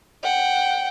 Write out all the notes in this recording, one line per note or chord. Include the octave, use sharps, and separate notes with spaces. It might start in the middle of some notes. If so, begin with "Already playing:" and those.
F#5 G5